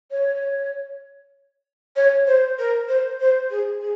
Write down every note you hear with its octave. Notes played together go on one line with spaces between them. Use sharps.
C#5
C#5
C5
A#4
C5
C5
G#4
G#4